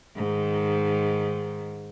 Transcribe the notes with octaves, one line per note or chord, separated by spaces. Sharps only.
G#2 D#3